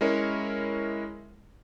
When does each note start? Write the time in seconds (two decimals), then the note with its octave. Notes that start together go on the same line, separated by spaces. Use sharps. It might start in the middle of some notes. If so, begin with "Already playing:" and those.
0.01 G#3 C#4 E4 A#4 C#5